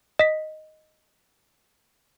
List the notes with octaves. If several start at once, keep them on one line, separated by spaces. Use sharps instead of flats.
D#5 B6